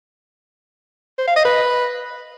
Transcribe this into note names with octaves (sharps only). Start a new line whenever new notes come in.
C5
F5
D#5
B4